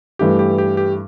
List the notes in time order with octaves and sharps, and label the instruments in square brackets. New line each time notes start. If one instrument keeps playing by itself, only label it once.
[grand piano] G2 E3 A3 E4 [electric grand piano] G4
[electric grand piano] G4
G4
G4